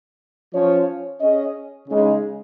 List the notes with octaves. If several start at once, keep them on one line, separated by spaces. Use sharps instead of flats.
F3 C#4 F4 C#5
C#4 G#4 D#5
C#3 G#3 D#4